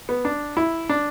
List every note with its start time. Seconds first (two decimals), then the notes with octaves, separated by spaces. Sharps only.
0.09 B3
0.25 D4
0.57 E4
0.89 D4